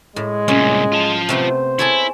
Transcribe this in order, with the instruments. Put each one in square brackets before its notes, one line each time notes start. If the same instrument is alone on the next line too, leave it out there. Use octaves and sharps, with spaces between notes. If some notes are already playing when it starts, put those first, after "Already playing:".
[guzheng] A2 [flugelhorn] G#3
[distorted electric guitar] C2 A#2 [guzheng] C#4
[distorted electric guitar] F4 A5
[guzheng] C3 A3 B3 [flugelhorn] C5
[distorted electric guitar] E4 [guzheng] G#4 A4 C#5